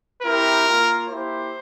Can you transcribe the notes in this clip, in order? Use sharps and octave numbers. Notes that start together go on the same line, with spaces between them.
C4 E4 G4 A#4
A#3 F4
A#3 E4 G4 C5